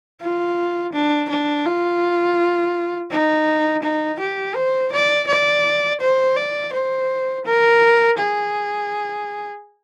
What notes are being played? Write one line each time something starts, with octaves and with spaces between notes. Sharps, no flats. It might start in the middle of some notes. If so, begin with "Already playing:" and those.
F4
D4
D4
F4
D#4
D#4
G4
C5
D5
D5
C5
D5
C5
A#4
G#4